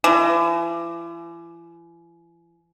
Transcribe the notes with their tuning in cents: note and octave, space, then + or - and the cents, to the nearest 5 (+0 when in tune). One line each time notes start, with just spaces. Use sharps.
E3 +40